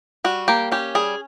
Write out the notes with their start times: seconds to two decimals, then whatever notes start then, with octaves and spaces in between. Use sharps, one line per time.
0.24 G3 F#4
0.48 A#3 G4
0.72 C#4 G4
0.95 G3 G#4